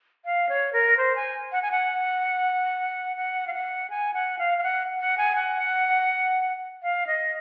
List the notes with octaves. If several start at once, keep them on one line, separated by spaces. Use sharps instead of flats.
F5
C#5
A#4
C5
G#5
F#5
G#5
F#5
F#5
F5
F#5
G#5
F#5
F5
F5
F#5
F#5
G#5
F#5
F5
D#5